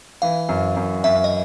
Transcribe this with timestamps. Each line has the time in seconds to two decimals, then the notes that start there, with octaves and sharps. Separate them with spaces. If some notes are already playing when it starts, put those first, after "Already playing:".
0.22 E3 F5
0.49 F#2
0.76 F#2
1.04 F#2 E5
1.24 D#5